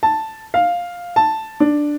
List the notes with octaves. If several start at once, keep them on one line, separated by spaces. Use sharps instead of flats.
A5
F5
A5
D4